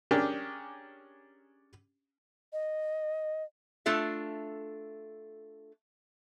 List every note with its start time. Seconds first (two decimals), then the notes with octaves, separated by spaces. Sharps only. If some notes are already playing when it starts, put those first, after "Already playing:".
0.11 C#4 D4 G4 G#4 A#4
2.53 D#5
3.86 A3 D4 F4 A4 E5